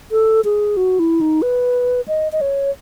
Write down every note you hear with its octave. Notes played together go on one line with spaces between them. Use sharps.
A4
G#4
F#4
E4
D#4
B4
D#5
D#5
C#5